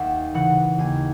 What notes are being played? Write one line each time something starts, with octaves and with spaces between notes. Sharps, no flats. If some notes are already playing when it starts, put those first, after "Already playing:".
Already playing: D#2 E5 F#5
C#3 E3 F#5
D#2 G#5